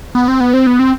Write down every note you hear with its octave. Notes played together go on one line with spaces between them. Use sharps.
B3
C4
B3
C4
B3
C4